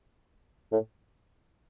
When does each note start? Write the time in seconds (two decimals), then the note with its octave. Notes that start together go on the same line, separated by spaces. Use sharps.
0.72 A2